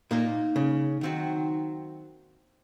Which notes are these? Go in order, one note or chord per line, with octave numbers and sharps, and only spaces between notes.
A#2 A#3 D#4 A#4
C#3
D#3 F#3 C4 F#4